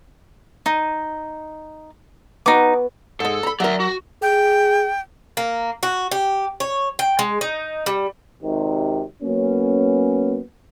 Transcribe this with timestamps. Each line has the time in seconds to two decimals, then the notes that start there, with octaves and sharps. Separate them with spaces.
0.66 D#4 D#5
2.46 B3 D#4 F#4 D6
3.20 G#2 G#3 A4
3.43 A#5 B5
3.60 F#3 A#4 D5 E5
3.80 F#4
4.22 G#4 G5
5.37 A#3
5.83 F#4
6.11 G4
6.60 C#5
6.99 G5
7.19 G#3
7.41 D#4
7.86 G3
8.43 G#1 C3 D#3
9.23 F#3 A#3 B3 C#4